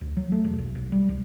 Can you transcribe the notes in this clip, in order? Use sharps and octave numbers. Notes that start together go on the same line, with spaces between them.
D2
F#3
A3
E1
B1
B1
G3
C2